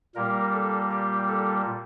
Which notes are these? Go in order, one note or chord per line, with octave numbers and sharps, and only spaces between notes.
A#2 G3 A#3 A#4
A4
G4
A4